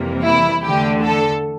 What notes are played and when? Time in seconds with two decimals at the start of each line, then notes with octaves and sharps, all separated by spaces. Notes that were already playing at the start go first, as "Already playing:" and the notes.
Already playing: F2 C3 E3 G3 A#3
0.24 E4
0.63 E2 D3 A3 G4
1.02 A4